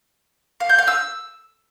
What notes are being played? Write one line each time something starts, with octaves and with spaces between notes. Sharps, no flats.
F5
G6
F5
E6